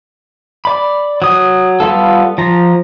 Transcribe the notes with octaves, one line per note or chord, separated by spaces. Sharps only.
D5 B5
F#3 D#6
G3 B3 F4 A4
F3 A#5